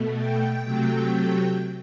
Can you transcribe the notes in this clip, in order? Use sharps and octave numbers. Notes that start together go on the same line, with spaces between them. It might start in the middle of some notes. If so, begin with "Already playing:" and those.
Already playing: B2 A3
G5
C3 F#3 A3